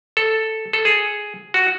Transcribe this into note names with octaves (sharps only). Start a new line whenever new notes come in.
A4
A4
G#4
F#4